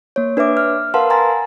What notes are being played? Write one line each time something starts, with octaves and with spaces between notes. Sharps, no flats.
A#3 C#5
D4 B4 C#5 E5 D6
F6
A#4 B4 F5 F#5 A5 C6
G#5 A#5 C6 A6